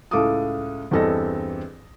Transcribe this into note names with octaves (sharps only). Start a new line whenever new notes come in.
C#2 A2 A4 F5 D6 D#6
E2 G2 C4 A4 D#5 A#6